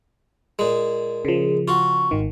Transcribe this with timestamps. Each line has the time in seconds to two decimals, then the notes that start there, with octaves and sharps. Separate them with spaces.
0.59 A#2 G#3
1.25 C#3 F3 G#4
1.68 F4 F#4 C#6
2.11 G#1 D#3